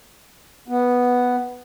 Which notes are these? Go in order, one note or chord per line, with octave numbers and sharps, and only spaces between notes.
B3